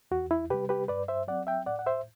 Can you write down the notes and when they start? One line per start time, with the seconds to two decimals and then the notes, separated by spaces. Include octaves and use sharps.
0.11 E2 F#4
0.31 E4
0.50 C3 G3 G4 B4
0.69 G4 B4
0.88 G2 B4 D5
1.08 C5 E5
1.28 F#3 C4 D5 F#5
1.47 E5 G5
1.66 A2 D5 F#5
1.79 F#5
1.86 C5 E5